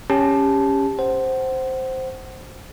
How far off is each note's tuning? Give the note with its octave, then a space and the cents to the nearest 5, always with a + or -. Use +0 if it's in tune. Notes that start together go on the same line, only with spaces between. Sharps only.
C#4 +0 G4 +25 A5 -10
C5 +0 F#5 +25